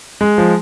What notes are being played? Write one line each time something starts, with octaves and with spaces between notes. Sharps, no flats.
G#3
F3